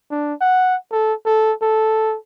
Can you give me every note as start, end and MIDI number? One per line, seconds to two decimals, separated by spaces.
0.11 0.33 62
0.41 0.76 78
0.92 1.13 69
1.26 1.53 69
1.62 2.16 69